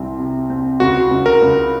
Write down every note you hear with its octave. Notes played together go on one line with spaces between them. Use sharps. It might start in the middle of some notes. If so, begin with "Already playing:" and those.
Already playing: C2 C4
C3
C4
C#2 F#4
C#2
A#4
C#2